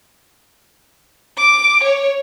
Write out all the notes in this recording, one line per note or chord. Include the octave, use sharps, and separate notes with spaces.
D6
C#5